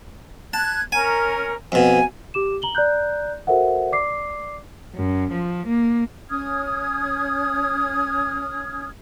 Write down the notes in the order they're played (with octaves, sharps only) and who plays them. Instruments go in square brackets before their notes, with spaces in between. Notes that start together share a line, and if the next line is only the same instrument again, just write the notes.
[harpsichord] A5 [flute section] F#6 G#6
[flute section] C#4 A#4 [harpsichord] G#5
[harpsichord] F2 B2 [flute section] G#5
[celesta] G4 D6 E7
A#5 F#7 G7
D5 A#5 F#6 G6
F#4 A4 A#4 C5 E5 F#5
D5 D6 C7
[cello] F#2
F3
A#3
[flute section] C#4 D#6 F6 G#6